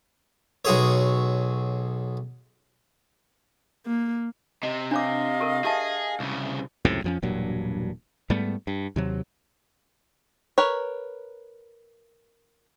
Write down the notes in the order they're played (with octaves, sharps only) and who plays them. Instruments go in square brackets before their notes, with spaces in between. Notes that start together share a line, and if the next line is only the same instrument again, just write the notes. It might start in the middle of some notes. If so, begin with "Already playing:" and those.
[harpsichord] B1 F#4 G#4 C#5
[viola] A#3
[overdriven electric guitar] C3 [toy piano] D#5
[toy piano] D4 C#5 D6 [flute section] D#5 F5
[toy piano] G4 A4 A#4
[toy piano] G4 E5 A5 [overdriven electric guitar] G#4
[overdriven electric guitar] C2 C#3
[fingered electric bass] C#2 F#2 A2 C3
F2 F3 C#4
E1 G2 A#2 F#3
G#2 G3 A3 B3
G2
D#2 C3 F#3
[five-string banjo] A#4 B4 C#5